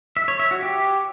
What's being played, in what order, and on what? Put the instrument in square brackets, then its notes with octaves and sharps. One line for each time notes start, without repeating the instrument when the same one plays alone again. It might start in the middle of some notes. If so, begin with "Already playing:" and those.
[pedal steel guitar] E5
C#5
E5
F#4
G4